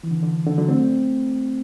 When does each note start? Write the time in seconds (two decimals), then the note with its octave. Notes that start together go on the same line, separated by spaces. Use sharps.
0.03 E3
0.11 D3
0.23 D3
0.46 D3
0.58 D3 F#3
0.69 A3 C4